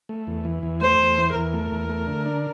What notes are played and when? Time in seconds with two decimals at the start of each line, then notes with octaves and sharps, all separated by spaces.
0.09 A3
0.27 E2
0.45 E3
0.63 E2
0.81 A3 C5
0.99 E2
1.18 E3
1.35 E2 A#4
1.53 A3
1.72 E2
1.89 A3
2.07 D3
2.26 D4